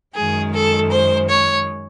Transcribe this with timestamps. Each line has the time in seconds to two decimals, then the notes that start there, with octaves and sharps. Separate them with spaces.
0.15 F#2 D#3 G#3 G#4
0.53 A4
0.91 C5
1.28 C#5